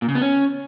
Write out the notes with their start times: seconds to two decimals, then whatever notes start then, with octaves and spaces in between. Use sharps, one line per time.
0.02 A#2
0.09 C#3
0.15 B3
0.22 C#4